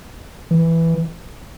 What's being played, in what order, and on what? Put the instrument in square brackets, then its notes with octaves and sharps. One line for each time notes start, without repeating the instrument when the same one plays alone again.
[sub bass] E3